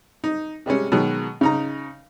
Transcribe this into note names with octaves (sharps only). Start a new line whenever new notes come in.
D#4
C3 G3 G#3 C#4
B2 D#3 F#3 G#3
C#3 D#4 A#5